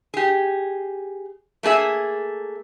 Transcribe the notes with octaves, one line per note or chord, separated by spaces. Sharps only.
G4 G#4
A3 A#3 G#4 E5